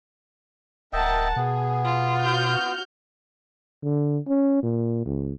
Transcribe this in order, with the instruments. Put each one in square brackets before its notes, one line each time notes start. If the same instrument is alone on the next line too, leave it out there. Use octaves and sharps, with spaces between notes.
[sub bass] D1 [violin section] A#4 F#5 A5 [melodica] D#5 E5 G5
[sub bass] B2 [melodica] B3 [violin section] G#4
[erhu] F4
[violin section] F#4 F6 G6
[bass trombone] D3
C#4
A#2
C#2